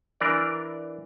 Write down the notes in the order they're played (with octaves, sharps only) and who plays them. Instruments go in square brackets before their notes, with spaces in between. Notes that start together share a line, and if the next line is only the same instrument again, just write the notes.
[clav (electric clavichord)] E3 D4 A#4 D5